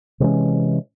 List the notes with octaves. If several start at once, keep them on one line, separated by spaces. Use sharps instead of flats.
C3 E3 G#3 C#4